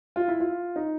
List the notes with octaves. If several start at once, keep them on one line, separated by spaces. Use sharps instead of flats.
F4
E4
F4
D#4